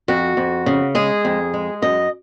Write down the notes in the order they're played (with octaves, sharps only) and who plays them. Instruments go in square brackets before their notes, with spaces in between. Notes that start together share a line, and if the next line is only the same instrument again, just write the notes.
[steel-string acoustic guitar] F2 F#4
F2
C#3
G#3 G#4
F2
G#3
F#2 D#5